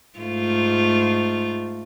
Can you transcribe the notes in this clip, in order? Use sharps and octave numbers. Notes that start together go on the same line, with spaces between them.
G#2 A3 F4